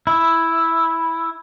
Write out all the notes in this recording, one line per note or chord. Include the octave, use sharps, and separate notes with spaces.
E4